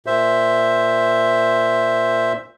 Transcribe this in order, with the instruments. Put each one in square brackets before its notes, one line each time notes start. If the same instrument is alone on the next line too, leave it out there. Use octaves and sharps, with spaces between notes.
[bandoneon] A#2 C5 E5